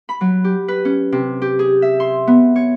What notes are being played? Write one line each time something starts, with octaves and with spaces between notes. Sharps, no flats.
B5
F#3
G4
B4
C#4
C3
G4
G#4
E5
C6
B3
C#5